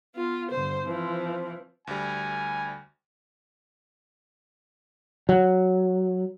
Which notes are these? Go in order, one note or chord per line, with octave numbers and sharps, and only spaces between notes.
B3 F4
G2 D3 C5
E3 F3 C4
D2 G3 G#5
F#3